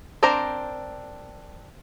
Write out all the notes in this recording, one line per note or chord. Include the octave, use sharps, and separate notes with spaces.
C4 D4 A#4 C5 A#5